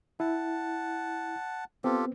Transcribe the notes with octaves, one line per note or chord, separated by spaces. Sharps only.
E4 F#5 A5
B3 C4 F4 G4 A4